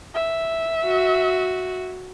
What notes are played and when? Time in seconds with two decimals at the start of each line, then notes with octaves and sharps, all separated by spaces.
0.14 E5
0.84 F#4